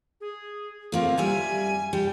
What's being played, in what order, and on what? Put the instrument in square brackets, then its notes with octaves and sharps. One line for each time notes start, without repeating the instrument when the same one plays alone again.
[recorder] G#4
[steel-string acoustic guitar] A3 A#3 C4 [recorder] F4
[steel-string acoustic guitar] F#2 G3 E5 [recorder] G#5
[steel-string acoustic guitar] G3 [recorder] G5